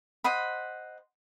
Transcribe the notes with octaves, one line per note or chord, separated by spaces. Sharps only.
C5 D#5 F#5 B5